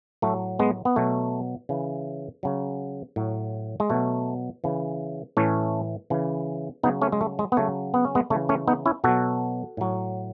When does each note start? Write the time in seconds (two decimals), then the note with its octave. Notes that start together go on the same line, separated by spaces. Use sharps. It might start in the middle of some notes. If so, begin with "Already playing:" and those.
0.22 A2 F#3 A3
0.59 G#3 B3
0.85 B3
0.96 B2 F#3 A3
1.69 C#3 E3
2.43 C#3 F#3
3.16 A2 F#3
3.80 G#3
3.90 B2 F#3 A3
4.64 C#3 E3
5.37 A2 E3 A3 C#4
6.10 C#3 E3
6.83 C#3 F#3 B3 D#4
7.02 A3 C#4
7.12 G#3
7.21 A3
7.39 G#3
7.52 B3
7.57 C#3 F#3 A3
7.94 B3
8.05 C#4
8.15 G#3 B3
8.30 C#3 A3
8.34 E3
8.49 A3 C#4
8.68 B3 D#4
8.86 C#4 E4
9.04 B2 F#3 F#4 A4
9.77 A2 F#3